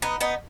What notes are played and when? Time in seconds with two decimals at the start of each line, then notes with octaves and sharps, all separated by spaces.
0.02 B3 D#4
0.21 B3 D#4